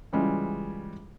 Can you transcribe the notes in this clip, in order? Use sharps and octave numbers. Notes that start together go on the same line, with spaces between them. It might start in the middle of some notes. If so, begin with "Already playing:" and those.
C#3 E3 G3 G#3 F4